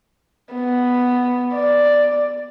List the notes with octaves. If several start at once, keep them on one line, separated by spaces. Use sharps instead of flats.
B3
D5